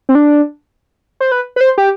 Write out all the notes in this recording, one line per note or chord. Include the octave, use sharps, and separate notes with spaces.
C4
D4
C5
B4
B4
C5
G4